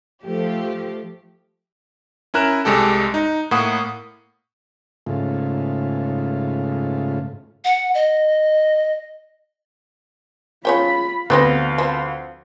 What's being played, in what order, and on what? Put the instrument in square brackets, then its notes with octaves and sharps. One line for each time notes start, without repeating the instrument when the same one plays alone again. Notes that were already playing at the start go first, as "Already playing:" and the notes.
[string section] F3 A3 G4
[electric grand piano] C#4 E4 A#4 F#6 E7
C2 G#3 G4 A4
D#4
A2 A#3 F#5 D#6
[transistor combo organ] G#2 C#3 A3 F4
[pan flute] F#5
D#5
[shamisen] C#3 C#5 G5 [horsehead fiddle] F4 B5
[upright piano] D2 B4 A#6 [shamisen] B3 C4 G4 [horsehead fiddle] F5
[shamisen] F3 C4